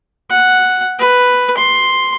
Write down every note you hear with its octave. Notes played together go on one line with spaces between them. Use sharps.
F#5
B4
C6